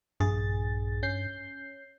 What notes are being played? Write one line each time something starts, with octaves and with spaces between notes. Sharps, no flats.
A#1 G2 G#4 A6
C#4 G6 C7